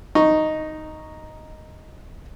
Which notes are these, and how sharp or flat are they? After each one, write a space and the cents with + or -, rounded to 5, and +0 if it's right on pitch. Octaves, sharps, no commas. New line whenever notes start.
D#4 +0 C#6 +0